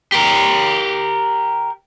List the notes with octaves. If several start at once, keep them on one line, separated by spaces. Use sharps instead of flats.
G4 A#4